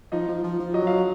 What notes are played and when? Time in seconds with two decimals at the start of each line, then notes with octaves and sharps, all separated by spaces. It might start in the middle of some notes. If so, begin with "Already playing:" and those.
0.12 F3 D#4 D#5
0.28 F3
0.44 F3
0.59 F3
0.74 F#3 D#5
0.87 F5